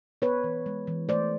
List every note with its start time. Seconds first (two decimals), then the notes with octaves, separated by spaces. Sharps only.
0.22 B3 B4 C#5
0.44 E3
0.66 G#3
0.87 E3
1.09 A3 C5 D5